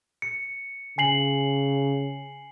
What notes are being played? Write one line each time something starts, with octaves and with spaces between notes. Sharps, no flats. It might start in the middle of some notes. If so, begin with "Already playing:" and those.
C#7
C#3 G#5 C7 F#7